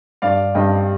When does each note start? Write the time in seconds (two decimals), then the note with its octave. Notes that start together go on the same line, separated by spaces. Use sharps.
0.22 G2 D5 F5
0.55 G2 D#5 G5